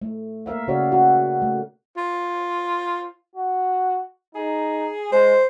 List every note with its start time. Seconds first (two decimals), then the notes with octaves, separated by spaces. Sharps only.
0.02 A3
0.46 A#3 A#4 E5 F5
0.68 C#3 F#4 C#5 D5 F5
0.92 F#4
1.42 A3
1.97 F4
3.36 F#4
4.35 D#4 G#4
5.12 G#3 C5